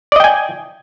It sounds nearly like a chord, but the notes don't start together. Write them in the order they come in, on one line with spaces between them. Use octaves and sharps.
D5 D#5 G5 G#5